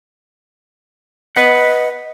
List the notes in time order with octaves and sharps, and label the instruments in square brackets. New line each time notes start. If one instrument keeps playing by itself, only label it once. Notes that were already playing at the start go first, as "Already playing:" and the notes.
[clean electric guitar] B4 F#5 [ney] D#5